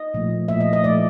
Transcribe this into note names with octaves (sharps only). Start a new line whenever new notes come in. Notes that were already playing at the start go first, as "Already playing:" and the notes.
Already playing: D#5
A#2 F3 A3
A#2 F3 A3 E5
D#5
D#5
A#2 F3 A3 D5